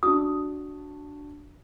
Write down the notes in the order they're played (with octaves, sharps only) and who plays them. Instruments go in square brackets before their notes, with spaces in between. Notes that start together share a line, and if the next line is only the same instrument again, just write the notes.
[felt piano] D4 F#4 [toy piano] D#6